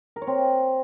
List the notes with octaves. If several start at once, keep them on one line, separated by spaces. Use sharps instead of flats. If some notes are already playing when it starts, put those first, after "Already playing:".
A#4
C#5
C4